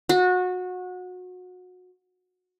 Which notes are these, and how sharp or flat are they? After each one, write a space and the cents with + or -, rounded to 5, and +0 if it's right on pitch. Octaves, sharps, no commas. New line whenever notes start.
F#4 -25